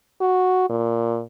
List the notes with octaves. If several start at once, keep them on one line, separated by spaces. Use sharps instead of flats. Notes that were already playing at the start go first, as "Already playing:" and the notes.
F#4
A#2